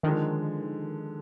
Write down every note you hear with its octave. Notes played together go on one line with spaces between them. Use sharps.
D3 D#3 F3 G#3